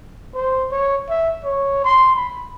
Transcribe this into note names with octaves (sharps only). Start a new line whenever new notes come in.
C5
C#5
E5
C#5
C6
B5